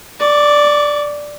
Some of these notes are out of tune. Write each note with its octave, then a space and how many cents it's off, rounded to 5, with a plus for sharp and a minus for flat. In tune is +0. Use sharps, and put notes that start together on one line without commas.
D5 +0 C#6 +45